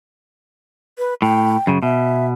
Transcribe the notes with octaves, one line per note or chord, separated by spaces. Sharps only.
B4
A2 G5
F#2 C#3
B2 E5